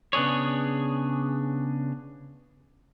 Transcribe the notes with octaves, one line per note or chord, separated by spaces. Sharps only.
C#3 B3 D4 G#4 C#5